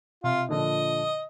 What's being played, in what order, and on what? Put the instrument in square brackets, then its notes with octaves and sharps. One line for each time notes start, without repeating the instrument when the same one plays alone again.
[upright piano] C3 [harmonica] F4
[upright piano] A#2 D3 F3 [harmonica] D#5